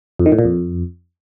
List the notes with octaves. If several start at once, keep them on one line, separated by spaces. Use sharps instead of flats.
F2
D#3
A2
A#2
F2